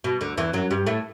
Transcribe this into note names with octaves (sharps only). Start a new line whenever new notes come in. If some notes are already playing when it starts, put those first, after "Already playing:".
B2
D2 D3
E2 E3
F#2 F#3
G2 G3
A2 A3